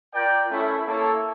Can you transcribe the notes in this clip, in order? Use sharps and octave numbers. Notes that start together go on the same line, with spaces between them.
F4 A#4 D5 G5
A3 C#4 E4
A#3 E4 A4 C#5